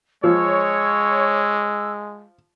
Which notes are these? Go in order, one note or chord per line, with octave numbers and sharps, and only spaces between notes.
F3 G#3 C#5 E6